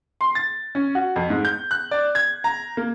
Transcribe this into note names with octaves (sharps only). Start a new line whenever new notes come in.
C6
A6
C#4
F#4
F2
G#2
G6
F#6
D5
G#6
A#5
A#3